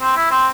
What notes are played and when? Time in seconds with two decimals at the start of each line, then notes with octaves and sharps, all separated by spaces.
0.01 C4
0.16 E4
0.31 C4